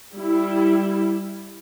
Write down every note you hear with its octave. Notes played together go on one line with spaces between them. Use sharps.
G3 E4